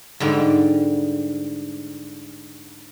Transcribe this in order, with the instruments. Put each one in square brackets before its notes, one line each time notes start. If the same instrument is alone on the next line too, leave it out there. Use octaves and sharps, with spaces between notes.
[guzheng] G#2 D3 G3